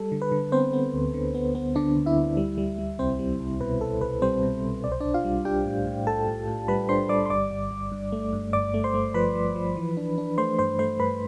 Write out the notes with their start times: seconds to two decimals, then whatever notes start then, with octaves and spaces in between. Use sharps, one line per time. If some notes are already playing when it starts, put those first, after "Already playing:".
Already playing: G3 A4
0.12 D3
0.22 B4
0.32 D3
0.52 B3 C4 C5
0.73 B3
0.94 D2
1.14 D3
1.35 B3
1.55 B3
1.76 D3 D4 D5
1.96 D2
2.06 E4 E5
2.17 D2
2.37 G3
2.58 G3
2.78 G3
2.99 C2 C4 C5
3.19 G3
3.40 C2
3.60 B2 B4
3.81 C2 A4
4.01 C2 B4
4.22 G3 C4 C5
4.42 B2
4.63 C2
4.84 B1 D5
4.92 C5
5.00 B1 D4 D5
5.14 F4 F5
5.25 G3
5.45 D4 G4 G5
5.66 A2
5.86 A2
6.07 A2 A4 A5
6.27 A2
6.47 A2
6.68 G3 B4 B5
6.89 D4 C5 C6
7.09 G3 D5 D6
7.26 C6
7.30 G1 D5 D6
7.51 G1
7.71 G1
7.92 G2
8.12 A3
8.33 G2
8.53 G1 D5 D6
8.74 A3
8.84 C5 C6
8.94 A3
9.14 F3 B4 B5
9.35 F3
9.56 F3
9.76 E3
9.97 D4
10.18 D4
10.38 A3 C5 C6
10.59 G2 C5 C6
10.79 A3 C5 C6
10.99 G2 B4 B5